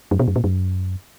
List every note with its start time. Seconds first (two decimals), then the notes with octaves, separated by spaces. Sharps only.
0.11 F#2
0.19 B2
0.28 F#2
0.36 A#2
0.44 F#2